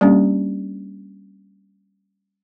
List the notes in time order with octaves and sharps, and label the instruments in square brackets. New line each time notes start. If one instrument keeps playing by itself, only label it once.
[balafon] G3 A#3 C#4 D4 G4